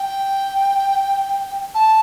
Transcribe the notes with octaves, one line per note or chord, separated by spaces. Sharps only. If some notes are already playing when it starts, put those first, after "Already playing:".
Already playing: G5
A5